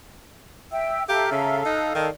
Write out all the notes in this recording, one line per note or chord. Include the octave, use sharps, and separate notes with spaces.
E5 G5 E6
G4 A4 E5 F5 A#5
C#3
D#4 F#6
D#3 D5